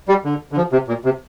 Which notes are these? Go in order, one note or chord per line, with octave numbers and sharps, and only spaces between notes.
G3
D3
D3
F3
C3
A#2
C3